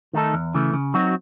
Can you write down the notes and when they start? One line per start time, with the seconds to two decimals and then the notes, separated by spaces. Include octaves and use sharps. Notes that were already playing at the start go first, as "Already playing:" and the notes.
0.13 D#3 A3 D#4 A4
0.34 E2
0.54 C#3 E3 A3
0.73 C#3
0.94 F#3 C4 D#4 F#4